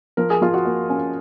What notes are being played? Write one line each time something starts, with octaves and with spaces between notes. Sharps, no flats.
F3 A#4
G#4
F3 F4
F#4
A#3
C#4